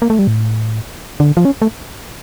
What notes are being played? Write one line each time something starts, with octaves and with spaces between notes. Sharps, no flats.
A#3
A3
G3
A2
D3
F3
C#4
A3